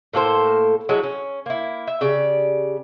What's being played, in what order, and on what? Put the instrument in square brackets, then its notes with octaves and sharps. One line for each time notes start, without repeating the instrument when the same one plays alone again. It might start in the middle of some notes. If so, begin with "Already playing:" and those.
[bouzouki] A2 A#3 A4 C5
F#3 G#3 A3 E4
C#4
A#3 E4
E5
C#3 G4 D5